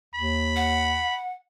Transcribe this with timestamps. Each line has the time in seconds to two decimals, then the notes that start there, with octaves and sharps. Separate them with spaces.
0.15 D#2 B5
0.56 F#5